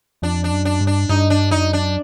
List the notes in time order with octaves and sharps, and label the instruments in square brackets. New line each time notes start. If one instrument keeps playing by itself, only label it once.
[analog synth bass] F2 [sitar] D4
[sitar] D4
[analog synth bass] F#2
[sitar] D4
[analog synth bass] G2
[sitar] D4
[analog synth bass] G2 [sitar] D#4
[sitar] D4
[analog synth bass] F#2 [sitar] D#4
[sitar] D4